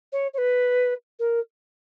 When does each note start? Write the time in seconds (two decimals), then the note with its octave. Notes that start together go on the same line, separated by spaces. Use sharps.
0.13 C#5
0.34 C#5
0.38 B4
1.19 A#4